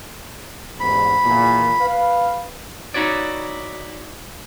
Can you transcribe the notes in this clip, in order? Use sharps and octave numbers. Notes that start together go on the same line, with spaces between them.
A1 E2 G#2 B5
E2 A#2
B4 F5
D#4 E4 F#4 C#5 D5